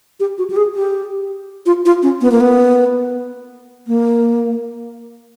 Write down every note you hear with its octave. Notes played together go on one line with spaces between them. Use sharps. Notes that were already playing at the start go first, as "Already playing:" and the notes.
G4
F#4
G4
G#4
G4
F4
F4
C#4
B3
A#3
B3
A#3